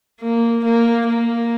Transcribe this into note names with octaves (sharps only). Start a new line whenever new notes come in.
A#3
A#3
A#3